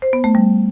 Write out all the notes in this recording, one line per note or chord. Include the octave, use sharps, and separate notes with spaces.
C5
B3
A3
G3